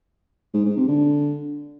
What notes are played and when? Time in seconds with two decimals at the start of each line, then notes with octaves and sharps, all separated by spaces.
0.54 G#2
0.65 G#2
0.77 C3
0.88 D3